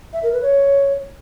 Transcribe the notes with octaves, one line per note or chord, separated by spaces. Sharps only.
E5
A#4
B4
C#5